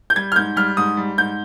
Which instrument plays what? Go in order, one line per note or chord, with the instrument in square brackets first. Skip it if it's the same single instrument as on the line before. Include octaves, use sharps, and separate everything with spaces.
[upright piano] G6
G3 G#6
F6
G#2 G6
G3 F6
G#2 D#6
G3
G#2 G6